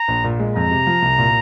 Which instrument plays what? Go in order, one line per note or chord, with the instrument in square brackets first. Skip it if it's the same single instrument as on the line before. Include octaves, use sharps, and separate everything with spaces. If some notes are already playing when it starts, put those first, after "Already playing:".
Already playing: [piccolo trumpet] A#5
[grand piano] A#1
A#2
G#3
[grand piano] F2 [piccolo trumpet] A#5
[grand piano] C3
F3
C2
A#2